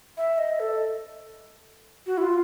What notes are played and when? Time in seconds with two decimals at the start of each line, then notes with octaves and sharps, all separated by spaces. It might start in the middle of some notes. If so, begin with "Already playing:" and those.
0.17 E5
0.38 D#5
0.60 A4
2.06 F#4
2.18 E4
2.22 F4